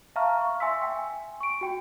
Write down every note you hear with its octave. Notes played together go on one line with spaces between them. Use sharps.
E5 F5 A5 A#5 C#6 F6
C#6
E5 G#5 C6 E6 B6
G5 G#5
C#6 D7
F#4 G5